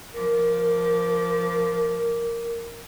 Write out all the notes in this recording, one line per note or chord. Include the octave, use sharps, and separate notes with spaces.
F3 A#4 D6